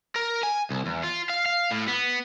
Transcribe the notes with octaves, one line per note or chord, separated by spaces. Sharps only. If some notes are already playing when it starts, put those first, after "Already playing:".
A#4
G#5
C2
E2
F4
F5
F5
A2
B3